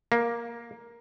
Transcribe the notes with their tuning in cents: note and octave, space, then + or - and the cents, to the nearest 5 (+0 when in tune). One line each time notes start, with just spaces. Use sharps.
A#3 +10